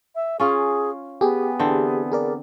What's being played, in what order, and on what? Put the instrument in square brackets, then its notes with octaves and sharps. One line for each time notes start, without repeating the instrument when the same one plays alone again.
[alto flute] E5
[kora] C#4 F4 F5 [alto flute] G#4
[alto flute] B3 [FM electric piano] G4 G#4
[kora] D3 E3 C4
[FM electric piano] G#4 A#4 D5